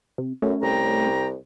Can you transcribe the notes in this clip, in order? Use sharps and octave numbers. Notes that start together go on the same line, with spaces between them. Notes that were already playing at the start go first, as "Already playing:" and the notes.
C3
F#2 A3 C#4
C2 G5 A#5